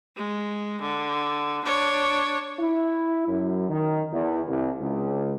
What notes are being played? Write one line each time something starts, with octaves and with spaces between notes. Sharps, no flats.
G#3
D3
D4 C#5
E4
F#2
D#3
E2
C2
C#2